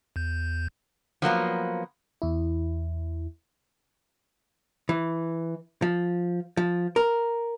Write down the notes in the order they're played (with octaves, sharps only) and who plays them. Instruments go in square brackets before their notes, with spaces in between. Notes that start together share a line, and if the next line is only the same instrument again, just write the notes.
[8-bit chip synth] E2 G6
[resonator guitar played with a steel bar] F3 F#3 A#3 B3
[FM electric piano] E2 E4
[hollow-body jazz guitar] E3
F3
F3
A#4